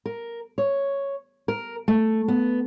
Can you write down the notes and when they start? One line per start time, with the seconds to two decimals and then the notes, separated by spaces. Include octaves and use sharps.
0.06 A#4
0.58 C#5
1.48 A#4
1.88 A3
2.28 B3